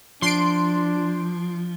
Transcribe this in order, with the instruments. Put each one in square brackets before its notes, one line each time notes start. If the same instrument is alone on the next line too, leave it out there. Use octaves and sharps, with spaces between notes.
[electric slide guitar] F3 [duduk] D4 [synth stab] C6 D7